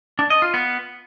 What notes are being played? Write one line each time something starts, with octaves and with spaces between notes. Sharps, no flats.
D4
D#5
F4
B3